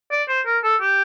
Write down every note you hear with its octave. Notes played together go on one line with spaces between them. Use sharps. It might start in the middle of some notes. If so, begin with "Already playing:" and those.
D5
C5
A#4
A4
G4